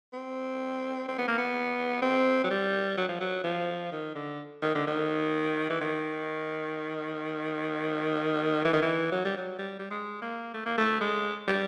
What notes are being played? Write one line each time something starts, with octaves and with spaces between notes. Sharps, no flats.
C4
C4
B3
A#3
B3
C4
F#3
G3
F#3
F3
F#3
F3
D#3
D3
D#3
D3
D#3
E3
D#3
E3
D#3
E3
F#3
G3
F#3
G3
G3
G#3
A#3
A3
A#3
A3
G#3
G3